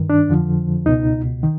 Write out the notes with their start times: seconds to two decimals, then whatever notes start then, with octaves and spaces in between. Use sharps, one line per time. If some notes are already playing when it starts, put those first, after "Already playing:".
Already playing: G2 D#3
0.10 D4
0.28 F2 D3 F3
0.86 C#2 B2 D#4
1.43 D#3